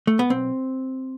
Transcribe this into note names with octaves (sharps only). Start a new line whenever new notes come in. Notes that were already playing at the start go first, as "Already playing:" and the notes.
A3
B3
B1 C4